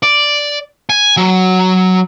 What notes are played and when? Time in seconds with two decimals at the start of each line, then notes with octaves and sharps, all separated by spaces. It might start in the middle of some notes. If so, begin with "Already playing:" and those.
0.03 D5
0.90 G#5
1.17 F#3